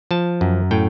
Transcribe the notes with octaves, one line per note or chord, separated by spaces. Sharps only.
F3 A5
F#2
A2 G5